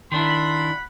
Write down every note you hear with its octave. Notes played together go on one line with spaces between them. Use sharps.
D#3 D4 E4 F#5 B5 C6